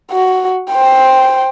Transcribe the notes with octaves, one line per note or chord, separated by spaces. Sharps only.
F#4
C5 G5